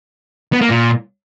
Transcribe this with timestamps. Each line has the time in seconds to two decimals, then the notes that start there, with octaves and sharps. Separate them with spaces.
0.53 B3
0.61 A#3
0.70 A#2